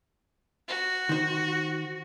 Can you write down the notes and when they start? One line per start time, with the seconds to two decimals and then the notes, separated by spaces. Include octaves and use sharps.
0.68 F#4
1.09 D#3 C5